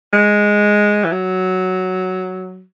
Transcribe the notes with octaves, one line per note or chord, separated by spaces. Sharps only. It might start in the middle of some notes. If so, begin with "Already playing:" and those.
G#3
E3
F#3